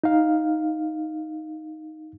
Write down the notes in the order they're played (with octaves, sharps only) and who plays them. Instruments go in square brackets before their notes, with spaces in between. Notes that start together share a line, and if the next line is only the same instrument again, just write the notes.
[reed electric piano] D#4 F5